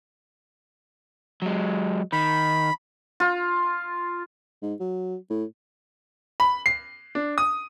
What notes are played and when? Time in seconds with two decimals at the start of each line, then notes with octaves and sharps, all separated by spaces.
1.42 F#3 G#3
2.12 D#3 B5
3.20 F4
4.62 G#2
4.80 F#3
5.30 A2
6.40 B5
6.66 C7
7.15 D4
7.38 D#6